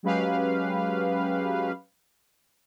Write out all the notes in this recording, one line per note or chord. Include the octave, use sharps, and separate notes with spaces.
F#3 G#3 C#4 G4 B4 F5